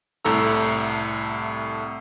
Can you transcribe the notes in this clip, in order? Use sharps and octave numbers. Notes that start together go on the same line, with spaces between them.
C2 A2 A4 A#5 E6